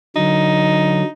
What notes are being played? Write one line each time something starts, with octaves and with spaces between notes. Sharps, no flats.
D3 F#3 D#4